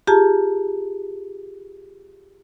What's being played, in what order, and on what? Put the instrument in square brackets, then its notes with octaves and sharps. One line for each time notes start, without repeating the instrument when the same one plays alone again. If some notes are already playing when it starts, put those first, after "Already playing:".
[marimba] F4 G4 G#4 A5 A#5